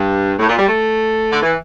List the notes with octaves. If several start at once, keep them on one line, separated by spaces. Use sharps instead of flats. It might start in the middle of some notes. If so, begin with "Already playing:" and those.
Already playing: G2
A2
A#2
G3
A3
D3
E3